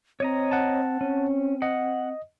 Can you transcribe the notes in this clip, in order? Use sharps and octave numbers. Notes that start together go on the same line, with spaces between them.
C4 C#5 D#5 A#5
F#5 A5
C4 C#4
D#5 F#5